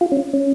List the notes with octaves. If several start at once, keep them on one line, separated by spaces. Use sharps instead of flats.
F4
C#4
C#4